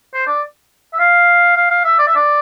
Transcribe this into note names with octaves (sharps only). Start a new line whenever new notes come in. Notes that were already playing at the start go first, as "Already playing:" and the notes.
C5
D5
E5
F5
F5
F5
E5
D5
E5
D5